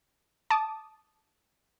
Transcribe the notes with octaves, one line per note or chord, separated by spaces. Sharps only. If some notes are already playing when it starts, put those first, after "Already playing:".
A5 D6 D#6